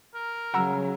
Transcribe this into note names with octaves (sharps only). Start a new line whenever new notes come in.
A#4
C#3 F#3 F#5 A#5 E6